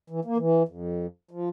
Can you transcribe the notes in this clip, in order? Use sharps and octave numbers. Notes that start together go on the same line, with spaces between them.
E3
A#3
E3
F2
F3